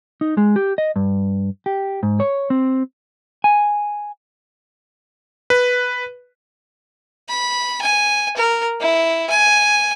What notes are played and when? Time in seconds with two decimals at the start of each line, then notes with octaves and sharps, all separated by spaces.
0.21 D#4
0.37 G#3
0.56 G4
0.78 D#5
0.96 G2
1.66 G4
2.03 G#2
2.20 C#5
2.50 C4
3.44 G#5
5.50 B4
7.29 B5
7.82 G#5
8.37 A#4
8.80 E4
9.30 G#5